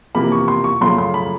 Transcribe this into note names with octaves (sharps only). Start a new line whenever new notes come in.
E2 C3 F3 A#3 B5
C#6
C6
C#6
F#2 C#3 F3 A3 C6
C6
B5